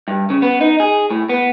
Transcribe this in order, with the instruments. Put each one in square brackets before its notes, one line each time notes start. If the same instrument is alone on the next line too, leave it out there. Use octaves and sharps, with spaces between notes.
[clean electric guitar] G2
C#3
B3
D#4
G#4
A2
B3